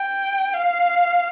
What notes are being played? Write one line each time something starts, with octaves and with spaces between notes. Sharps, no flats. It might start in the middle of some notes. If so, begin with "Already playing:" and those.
Already playing: G5
F5